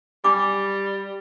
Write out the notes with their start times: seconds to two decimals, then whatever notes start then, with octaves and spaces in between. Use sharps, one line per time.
0.24 G3 D4 G5 D6